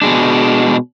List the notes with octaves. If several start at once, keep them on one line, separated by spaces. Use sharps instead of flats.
B2 G#3 D4